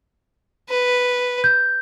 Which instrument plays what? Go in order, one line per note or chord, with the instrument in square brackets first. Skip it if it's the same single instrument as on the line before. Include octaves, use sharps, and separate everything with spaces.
[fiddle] B4
[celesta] G6